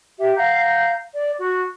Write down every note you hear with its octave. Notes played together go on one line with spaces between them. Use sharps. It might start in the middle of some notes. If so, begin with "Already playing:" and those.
G4 E5
F5 F#5 A#5 G6
D5
F#4